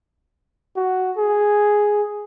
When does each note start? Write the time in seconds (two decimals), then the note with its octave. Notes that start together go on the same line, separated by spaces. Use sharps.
0.76 F#4
1.17 G#4